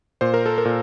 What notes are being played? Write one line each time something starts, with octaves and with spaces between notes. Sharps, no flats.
A#2 C5
A#4
A4
A#4
A#2